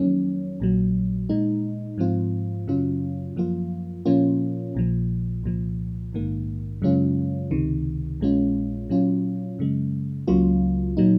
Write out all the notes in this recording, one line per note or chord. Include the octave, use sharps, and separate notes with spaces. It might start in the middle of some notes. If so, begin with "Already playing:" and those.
Already playing: F2 D#3 F#3 A#3 C#4
A#1 A#2 F#3
A#2 G#3 D#4
G#2 F3 C4 F4
F#2 C#3 F#3 C#4 F4
F#2 F3 A#3 F4
A#2 F3 A#3 C#4 F4
A#1 A#2 F3
C2 A#2 F3
A#1 G#2 D#3 A#3
F#2 C#3 G#3 C#4 F4
C#2 C3 D#3
A#1 A#2 G#3 C#4 F4
A#2 F#3 C#4 F4
F#2 C#3 G#3
C#2 C#3 F#3 A#3 F4
A#2 F#3 A#3 D#4